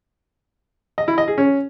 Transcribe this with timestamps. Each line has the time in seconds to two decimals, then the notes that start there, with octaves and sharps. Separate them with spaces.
0.98 D#5
1.08 E4
1.18 D#5
1.28 G#4
1.38 C#4